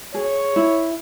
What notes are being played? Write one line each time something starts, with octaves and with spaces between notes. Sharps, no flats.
G#4 C#5
E4